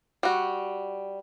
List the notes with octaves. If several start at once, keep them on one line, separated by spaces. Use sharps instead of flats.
G3 F#4